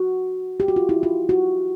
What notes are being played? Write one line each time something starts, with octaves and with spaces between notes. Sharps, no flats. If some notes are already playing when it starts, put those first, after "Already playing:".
Already playing: F#4
G4
F#4
F4
E4
F4
F#4